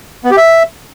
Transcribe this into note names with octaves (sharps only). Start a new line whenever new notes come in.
B3
G4
E5